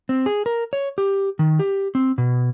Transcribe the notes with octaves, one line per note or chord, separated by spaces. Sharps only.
C4
G#4
A#4
C#5
G4
D#3
G4
C4
B2